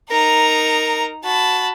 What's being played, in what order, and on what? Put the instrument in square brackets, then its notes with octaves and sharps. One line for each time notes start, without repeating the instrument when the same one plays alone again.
[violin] D#4 A#5 [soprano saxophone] A#4
[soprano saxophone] F#4 [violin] A5 B5